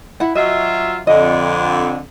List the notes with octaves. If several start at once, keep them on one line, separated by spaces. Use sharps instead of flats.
E4 F#5
F#3 F4 F#4 D#5 E5
F2 D3 D#5